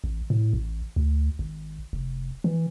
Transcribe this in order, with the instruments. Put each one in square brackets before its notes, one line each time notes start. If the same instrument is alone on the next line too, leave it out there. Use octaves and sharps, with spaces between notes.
[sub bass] A1
A2
A1
D2
G#1
F1
E3